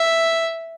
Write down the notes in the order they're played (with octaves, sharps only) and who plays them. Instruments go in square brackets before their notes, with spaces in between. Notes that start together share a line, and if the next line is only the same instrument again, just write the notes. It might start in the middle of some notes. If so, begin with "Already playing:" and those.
Already playing: [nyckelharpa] E5